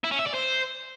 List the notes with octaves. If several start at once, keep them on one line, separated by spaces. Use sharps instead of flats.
E4
C#4
E5
D5
C5